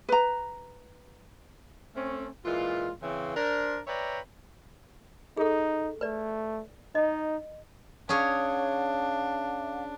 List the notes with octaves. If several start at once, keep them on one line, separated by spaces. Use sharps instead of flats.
B4 A#5
A3 C4 C#4
A#2 E3 G#3 F4
C#3 E3 C4
D4 A#4 C5
B4 C#5 D5 E5 G5 A#5
D#4 G#4 A4
A3 B4 D5
D#4 D#5
C#4 D4 G#4 C#5 F5